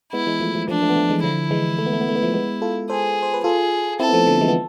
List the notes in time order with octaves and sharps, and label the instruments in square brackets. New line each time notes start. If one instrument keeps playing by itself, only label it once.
[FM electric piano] G#3 B3 [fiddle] E4
[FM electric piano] E3 G#3
F3 A3
F3 A3
[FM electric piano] F3 A3 [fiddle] D4
[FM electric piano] F3 A3
B3
F3 A3
E3 G#3
[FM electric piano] D3 F3 [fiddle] E4
[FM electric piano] E3 G#3
A3
B3
A3
B3
A3
B3
F3 A3
G#3 B3
F4 A4
[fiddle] G#4 [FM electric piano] A4 C5
[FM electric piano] C5
B4
[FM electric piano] F4 A4 [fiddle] G#4
[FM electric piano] C4 E4 [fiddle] A4
[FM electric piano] B3
F3 A3
D3 F3
E3 G#3
B3